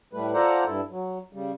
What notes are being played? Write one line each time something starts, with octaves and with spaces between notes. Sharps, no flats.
A2 G3 A3 B4
F4 A4 C5 D5 F#5 A#5
G2 E4 A4
F#3
C#3 G3